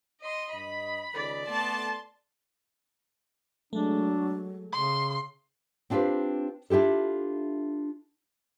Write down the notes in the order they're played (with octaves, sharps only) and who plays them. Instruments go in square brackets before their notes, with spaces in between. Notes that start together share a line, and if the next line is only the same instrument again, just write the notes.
[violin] D#5 C6
[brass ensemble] G2 D#5 [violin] B5
[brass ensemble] C#2 D#3 G#3 [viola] D5
[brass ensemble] A3 B3 A4 [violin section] A5 [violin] C6
[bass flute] F#3 [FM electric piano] G#3 A3 [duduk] D4
[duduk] C#3 [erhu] C6
[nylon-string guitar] C4 D4 F4 G4 B4 C5
D4 E4 F4 G4 A4